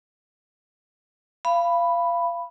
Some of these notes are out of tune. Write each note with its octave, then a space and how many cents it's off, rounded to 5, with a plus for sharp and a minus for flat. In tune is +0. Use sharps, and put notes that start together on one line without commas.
F5 -25 B5 +0